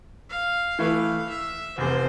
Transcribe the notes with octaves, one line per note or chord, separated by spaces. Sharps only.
F5
E3 A3 E4 B4 F5
E5
F1 E2 C3 C5